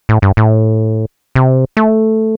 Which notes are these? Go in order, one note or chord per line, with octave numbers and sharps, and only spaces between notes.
A2
G2
A2
C3
A3